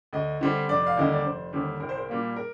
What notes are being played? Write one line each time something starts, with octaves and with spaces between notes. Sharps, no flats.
D2 D#5
D3 G3 C4
F1 D5
F5
D#2 D3 G3 D#5
D5
F1 C5
D#2 D3 G3
C2 A#4
C5
A#4
A#2 G3 A#3
A#4